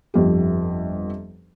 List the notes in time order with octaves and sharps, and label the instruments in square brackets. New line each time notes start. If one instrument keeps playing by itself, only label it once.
[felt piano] G1 F2 G4